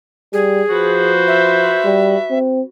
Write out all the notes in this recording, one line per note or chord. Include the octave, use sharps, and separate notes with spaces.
G3 G#4
F3 F#4 B4 C5
E5
G3
C4